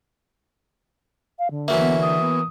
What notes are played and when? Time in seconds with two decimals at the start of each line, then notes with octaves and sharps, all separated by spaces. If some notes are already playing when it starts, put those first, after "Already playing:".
1.39 F5
1.51 D3
1.68 E3 F#3 A#3 E5
1.80 B3
2.03 D#6
2.21 B3